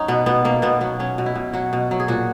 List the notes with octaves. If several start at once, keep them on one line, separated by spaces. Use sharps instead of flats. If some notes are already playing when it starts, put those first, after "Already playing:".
Already playing: F#3 C#4 D#4
B2 B3
B2 B3
B2 A#3
B2 B3
F#3 B3
F#3 C#4
B2
E4
B2
F#3 F#4
B2
F#3
G#4
A#2 F#4